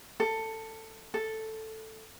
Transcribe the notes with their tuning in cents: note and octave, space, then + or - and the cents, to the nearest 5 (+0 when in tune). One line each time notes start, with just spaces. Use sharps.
A4 +15
A4 +0